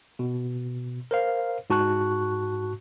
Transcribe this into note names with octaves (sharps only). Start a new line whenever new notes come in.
B2
A#4 C5 F5
G#2 F#4 A5 C#6 F#6